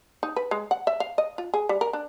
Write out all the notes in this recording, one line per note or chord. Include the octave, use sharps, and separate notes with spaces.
D#4
B4
G#3
F#5
E5
F5
D#5
F4
G#4
G3
A#4
D4